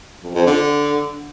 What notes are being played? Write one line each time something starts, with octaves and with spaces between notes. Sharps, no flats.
F2
F2
D3